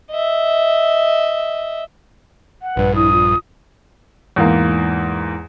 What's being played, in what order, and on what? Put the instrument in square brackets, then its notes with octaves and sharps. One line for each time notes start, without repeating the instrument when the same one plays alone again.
[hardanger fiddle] D#5 E5
[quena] F#5
[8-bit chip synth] A#1 G2 [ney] B4
[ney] E4 [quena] D#6
[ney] F4
[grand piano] E2 G#2 E3 A#3